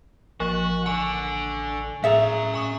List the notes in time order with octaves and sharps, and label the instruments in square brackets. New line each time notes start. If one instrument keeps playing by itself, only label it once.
[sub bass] A1 [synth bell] F3 A#3 [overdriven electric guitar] F#4
[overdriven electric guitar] D3 D4 [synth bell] G#5 C#6
[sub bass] A2 [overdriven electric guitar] C#4 A#5 [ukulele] G#4 D5 E5
[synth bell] G#5 C#6 D#6